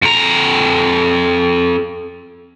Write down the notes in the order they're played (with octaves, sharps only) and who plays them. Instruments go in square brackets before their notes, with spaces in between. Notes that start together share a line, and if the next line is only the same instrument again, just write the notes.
[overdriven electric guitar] F2 A#5